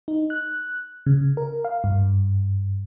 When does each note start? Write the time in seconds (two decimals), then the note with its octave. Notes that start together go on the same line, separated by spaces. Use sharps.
0.08 D#4
0.30 F#6
1.06 C#3
1.37 A#4
1.65 F5
1.84 G2